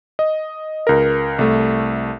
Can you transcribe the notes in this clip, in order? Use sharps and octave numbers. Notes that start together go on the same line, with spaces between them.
D#5
C#2 A#4
C2 A3